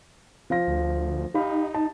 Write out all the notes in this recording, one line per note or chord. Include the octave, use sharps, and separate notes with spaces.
F3 F5 A#6
D2
D#4 G4 F5 B5
A5